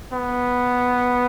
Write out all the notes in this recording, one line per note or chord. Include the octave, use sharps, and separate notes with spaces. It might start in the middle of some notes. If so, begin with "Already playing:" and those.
B3